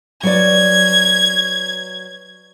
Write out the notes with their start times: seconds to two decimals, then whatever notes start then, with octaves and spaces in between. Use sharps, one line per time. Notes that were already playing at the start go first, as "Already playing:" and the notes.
0.23 F#3 B4 D5 G#6